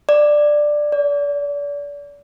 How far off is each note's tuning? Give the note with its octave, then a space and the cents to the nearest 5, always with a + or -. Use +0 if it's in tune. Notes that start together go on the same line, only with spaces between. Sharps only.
D5 +10
D5 -35